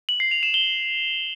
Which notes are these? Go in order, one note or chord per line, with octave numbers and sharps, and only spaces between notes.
F#7
C7
F7
E7
G7